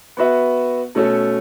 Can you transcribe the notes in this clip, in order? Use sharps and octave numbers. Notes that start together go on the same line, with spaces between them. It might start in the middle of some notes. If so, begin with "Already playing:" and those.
B3 F#4 B4 E5
B2 A3 C#4 A4